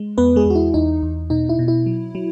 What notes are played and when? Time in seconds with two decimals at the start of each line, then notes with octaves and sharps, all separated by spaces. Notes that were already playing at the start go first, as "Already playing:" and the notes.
Already playing: G#3
0.18 E2 B3 B4
0.36 G#3 G#4
0.46 E2 F#4
0.55 E4
0.74 E2 D#4
1.02 E2
1.30 B2 D#4
1.49 E4
1.59 B2
1.68 E4
1.86 F#3
2.15 F#3